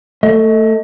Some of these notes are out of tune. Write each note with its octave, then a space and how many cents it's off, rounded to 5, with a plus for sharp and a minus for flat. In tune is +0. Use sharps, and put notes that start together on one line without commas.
A3 +15 D#5 +30